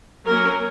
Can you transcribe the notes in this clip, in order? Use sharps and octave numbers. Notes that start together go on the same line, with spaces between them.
F#3 A#3 C#4 A#4